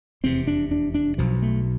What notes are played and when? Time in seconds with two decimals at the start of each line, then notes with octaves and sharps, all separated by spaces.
0.23 F1 E2 C3 C4
0.47 D4
0.71 D4
0.94 D4
1.18 B1 B2 F3
1.42 A3